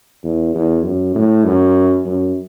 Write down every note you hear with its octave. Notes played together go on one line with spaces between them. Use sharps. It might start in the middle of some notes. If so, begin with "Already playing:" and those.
E2
E2
F#2
A2
F#2
F#2